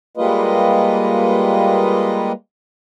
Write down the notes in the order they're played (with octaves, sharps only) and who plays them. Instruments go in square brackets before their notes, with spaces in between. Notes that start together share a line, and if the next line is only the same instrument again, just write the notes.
[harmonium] G3 G#3 A#3 F4 B4 D#5